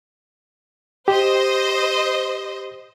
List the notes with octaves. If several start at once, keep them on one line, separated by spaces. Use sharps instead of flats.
G4 C5 D#5